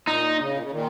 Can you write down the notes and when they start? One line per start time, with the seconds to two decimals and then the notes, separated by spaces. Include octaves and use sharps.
0.07 A#2 D#4
0.39 C#3
0.54 A#2
0.63 C#3
0.71 A#2 D#3